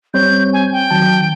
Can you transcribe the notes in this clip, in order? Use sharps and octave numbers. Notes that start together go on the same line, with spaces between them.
G3 C4 C#5 G6
G#5
G5
D#3 F#3 A5